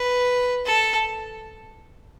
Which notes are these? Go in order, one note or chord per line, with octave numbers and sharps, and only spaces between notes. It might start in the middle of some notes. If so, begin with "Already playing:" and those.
Already playing: B4
A4